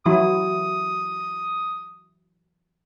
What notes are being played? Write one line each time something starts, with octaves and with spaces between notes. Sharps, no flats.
E3 F#3 E4 D#6